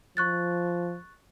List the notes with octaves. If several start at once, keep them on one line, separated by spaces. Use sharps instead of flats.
F3 C#6 F#6 A6